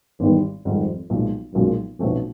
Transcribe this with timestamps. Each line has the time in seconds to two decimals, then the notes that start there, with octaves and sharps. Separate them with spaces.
0.20 G#1 E2 G#2 D#3 G3
0.65 G#1 F2 G#2 D#3 G3
1.10 B1 A#2 F3 G#3
1.54 B1 F#2 A#2 F3 G#3
1.99 B1 F2 B2 F#3 A3 C#4